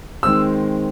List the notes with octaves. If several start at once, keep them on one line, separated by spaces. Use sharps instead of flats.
D#3 G#3 C4 E6